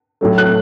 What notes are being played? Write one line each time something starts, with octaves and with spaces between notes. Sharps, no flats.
A2 F#3 A3
F#6